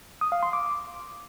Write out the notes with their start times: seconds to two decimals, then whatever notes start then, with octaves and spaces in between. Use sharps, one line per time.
0.21 D#6
0.32 F5
0.43 C6
0.53 D6